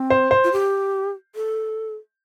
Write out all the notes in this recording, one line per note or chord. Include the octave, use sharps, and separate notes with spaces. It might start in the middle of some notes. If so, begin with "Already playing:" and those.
Already playing: C4
C5
C5
F4
G4
A4